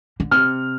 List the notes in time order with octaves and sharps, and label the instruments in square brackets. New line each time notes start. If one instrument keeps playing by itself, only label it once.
[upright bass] D3
[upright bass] C3 [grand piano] F6